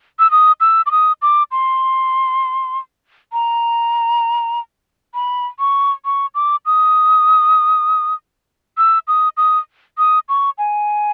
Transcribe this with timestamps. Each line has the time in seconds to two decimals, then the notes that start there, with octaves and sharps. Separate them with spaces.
0.19 E6
0.31 D#6
0.61 E6
0.86 D6
0.91 D#6
1.22 D6
1.52 C6
3.33 A#5
5.14 B5
5.59 C#6
6.05 C#6
6.35 D6
6.66 D#6
8.78 E6
9.08 D#6
9.37 D#6
9.98 D#6
10.29 C#6
10.58 G#5